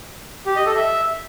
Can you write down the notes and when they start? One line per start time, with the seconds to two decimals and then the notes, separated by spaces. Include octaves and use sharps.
0.46 G4
0.56 D#5
0.66 A4
0.76 E5